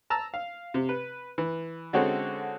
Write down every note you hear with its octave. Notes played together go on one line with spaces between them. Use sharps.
A5 A#5 E6
F5
C3
B4
E3
D3 G#3 C4 C#4 F#4 A4